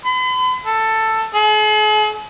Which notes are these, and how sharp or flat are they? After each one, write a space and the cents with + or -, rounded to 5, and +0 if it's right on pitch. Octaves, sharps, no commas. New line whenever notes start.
B5 +45
A4 +10
G#4 +45